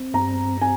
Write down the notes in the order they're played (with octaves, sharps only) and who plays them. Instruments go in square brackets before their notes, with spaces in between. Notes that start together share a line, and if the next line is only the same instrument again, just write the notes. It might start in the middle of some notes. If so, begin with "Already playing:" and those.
Already playing: [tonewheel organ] C4
[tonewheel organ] G2 [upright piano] A#5
[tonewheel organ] C4 [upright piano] G#5